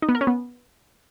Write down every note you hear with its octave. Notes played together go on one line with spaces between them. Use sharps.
D#4
B3
A#4
C#4
B3